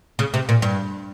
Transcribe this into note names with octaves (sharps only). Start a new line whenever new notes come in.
C#3
C3
A#2
G2